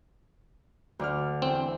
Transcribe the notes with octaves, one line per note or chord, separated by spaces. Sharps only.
D2 D5 F6
E2 C4